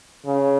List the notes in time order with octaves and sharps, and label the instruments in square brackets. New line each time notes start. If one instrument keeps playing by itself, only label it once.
[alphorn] C#3